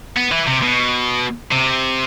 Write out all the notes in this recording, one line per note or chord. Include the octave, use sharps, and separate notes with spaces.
B3
E3
C3
B2
C3